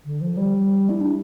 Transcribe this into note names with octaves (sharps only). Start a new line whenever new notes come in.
D3
F3
G3
E4
D4